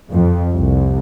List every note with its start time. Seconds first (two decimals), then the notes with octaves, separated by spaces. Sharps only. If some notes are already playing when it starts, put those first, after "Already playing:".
0.11 F2
0.54 C2